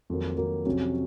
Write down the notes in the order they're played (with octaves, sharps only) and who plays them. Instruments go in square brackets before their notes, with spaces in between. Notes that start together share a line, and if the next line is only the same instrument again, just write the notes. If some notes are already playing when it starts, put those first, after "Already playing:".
[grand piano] F2 D#3 F#3 A#3
F2 D#3 F#3 A#3
F2 C3 F#3 C#4